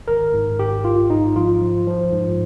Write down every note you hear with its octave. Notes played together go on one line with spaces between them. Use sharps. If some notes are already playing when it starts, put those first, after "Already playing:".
G#1 A#4
G#2
G#1 G4
G#1 F4
G#2 D#4
F3 F4
F3
F3
G#2